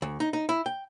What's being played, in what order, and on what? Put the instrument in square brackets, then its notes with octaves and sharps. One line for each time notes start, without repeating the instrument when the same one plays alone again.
[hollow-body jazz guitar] D2
D#4
D#4
E4
G5